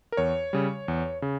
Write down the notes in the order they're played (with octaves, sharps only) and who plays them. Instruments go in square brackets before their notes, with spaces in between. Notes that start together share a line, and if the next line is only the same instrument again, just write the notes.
[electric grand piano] A#4
E2 C#5
C#3 G3
E2
C#3